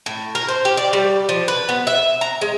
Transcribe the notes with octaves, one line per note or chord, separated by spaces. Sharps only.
A2
A#4
C5
G4
D5
G3
F3
B4
B3
E5
A#5
G#3